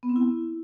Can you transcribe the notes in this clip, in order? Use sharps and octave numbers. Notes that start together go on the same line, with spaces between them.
B3
C4
E4